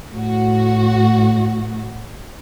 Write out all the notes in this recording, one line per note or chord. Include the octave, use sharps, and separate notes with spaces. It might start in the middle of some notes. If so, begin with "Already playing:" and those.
A2 F#4